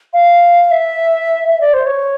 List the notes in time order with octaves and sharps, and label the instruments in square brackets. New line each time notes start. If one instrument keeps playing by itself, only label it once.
[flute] F5
E5
E5
D5
C5
C#5